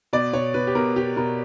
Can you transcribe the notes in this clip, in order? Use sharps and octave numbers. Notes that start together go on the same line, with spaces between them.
B2 D5
B2 C#5
B2 B4
G4
B2 A#4
B2 G4
B2 A#4